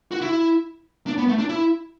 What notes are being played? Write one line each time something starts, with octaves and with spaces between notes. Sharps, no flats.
F#4
E4
D4
B3
A3
D4
E4